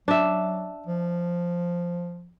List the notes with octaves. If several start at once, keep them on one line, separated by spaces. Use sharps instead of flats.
F#3 D4 E5
F3